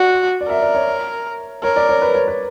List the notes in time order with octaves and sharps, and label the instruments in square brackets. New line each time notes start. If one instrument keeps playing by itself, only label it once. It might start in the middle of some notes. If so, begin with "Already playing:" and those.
Already playing: [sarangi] F#4 [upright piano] D5
[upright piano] D5
[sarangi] A#4 [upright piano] E5
[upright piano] D5
C#5
[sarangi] A#4 [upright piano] C#5
[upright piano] D5
C#5
B4
C#5
B4